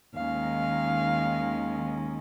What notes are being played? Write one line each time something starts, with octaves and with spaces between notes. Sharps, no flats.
D#2 D#3 G#3 C#4 F5